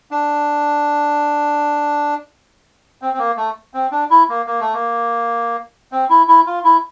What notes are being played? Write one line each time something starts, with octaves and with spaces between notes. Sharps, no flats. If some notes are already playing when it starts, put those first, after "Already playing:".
D4
C4
C4
A#3
A3
C4
D4
E4
A#3
A#3
A3
A#3
C4
E4
E4
F4
E4